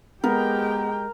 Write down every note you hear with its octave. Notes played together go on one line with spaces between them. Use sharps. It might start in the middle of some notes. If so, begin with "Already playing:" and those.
G#3 B3 G4 A#4 G5